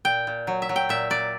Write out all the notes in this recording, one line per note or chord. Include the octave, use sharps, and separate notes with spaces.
A#2 G5
A#2
F#3
E5
F#3
G5
A#2 E5
A#2 D5